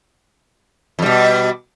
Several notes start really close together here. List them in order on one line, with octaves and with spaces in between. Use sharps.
F2 G3 B2